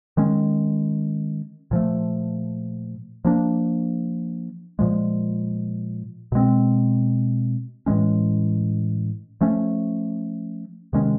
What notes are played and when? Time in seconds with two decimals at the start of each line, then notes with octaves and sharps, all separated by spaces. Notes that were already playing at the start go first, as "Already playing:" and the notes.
0.17 D#3 G#3 C#4
1.71 A#2 F3 A3
3.25 F3 A#3 D4
4.79 A#2 F3 G#3
6.32 B2 G#3 C4
7.86 A2 E3 G#3 C#4
9.41 F3 A3 C#4
10.93 C3 D#3 G#3 C#4